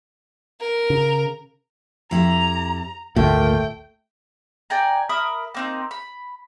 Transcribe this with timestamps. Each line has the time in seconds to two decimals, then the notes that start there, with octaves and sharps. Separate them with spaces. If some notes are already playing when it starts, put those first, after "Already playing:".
0.60 A#4
0.90 C#3
2.11 F2 E4 G4 A#5
3.16 G#1 D2 A#2 A3 A#3 G5
4.70 D5 G5 G#5 A#5
5.09 A#4 E5 B5 D#6
5.55 A#3 C4 D#4
5.91 B5